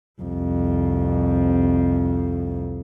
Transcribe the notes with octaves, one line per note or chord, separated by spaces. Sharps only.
C2 F2